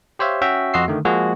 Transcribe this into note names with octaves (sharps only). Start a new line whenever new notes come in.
G4 C5 C#5 E5 F5
C#4 F#4 E5 G5
F2 F#4 D#5 C6 E6 C7
D3 D#3 A3
F3 G#3 A#3 F#4 G#4